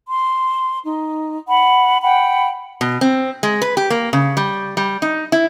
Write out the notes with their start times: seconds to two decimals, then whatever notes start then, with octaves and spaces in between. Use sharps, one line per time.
0.07 C6
0.84 D#4
1.48 F#5 B5
2.02 F#5 G5 B5
2.81 B2
3.01 C4
3.43 G#3
3.62 B4
3.77 G4
3.90 A#3
4.13 C#3
4.37 G3
4.77 G3
5.02 D#4
5.32 E4